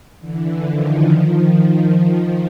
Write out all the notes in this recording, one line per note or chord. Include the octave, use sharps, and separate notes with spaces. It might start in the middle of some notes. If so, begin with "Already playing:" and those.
D3 E3
D#3 F3
D#3 F3